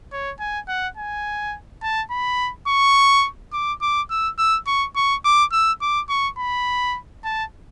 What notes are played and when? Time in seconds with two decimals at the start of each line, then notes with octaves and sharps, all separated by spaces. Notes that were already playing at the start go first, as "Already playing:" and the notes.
0.12 C#5
0.40 G#5
0.68 F#5
0.97 G#5
1.83 A5
2.11 B5
2.68 C#6
3.53 D6
3.82 D6
4.10 E6
4.39 E6
4.67 C#6
4.96 C#6
5.25 D6
5.52 E6
5.81 D6
6.09 C#6
6.38 B5
7.24 A5